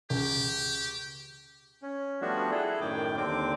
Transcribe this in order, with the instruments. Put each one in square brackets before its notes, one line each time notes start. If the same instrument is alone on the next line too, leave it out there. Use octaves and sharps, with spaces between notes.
[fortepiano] C#2 [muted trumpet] G4
[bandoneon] C#4
F3 G3 A3 B3 D4 F#4
E4 G#4 A4
F#2 A2 D#3 G5 D6
D#2 D3 C4 D6